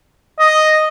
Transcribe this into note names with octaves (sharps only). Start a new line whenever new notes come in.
D#5